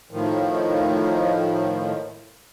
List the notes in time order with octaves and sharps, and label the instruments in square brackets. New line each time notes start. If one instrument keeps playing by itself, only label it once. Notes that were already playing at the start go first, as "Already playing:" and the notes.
[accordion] A2 D#3 F3